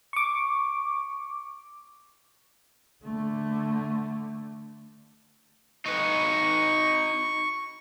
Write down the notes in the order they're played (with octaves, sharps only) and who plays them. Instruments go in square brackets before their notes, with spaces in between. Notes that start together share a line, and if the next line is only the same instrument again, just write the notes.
[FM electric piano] C#6 D6
[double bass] D3 A3
[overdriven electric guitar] D#4 B4 [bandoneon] C#6